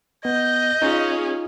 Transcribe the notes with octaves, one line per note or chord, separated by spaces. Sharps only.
B3 D#5 G6
C#4 D#4 F4 G#4